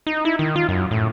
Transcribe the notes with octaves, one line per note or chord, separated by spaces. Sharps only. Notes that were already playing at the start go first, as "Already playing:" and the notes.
D#4
E4
D#3
F4
F#2
A2